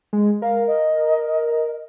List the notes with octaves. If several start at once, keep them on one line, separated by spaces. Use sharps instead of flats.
G#3
A#4 F5
D#5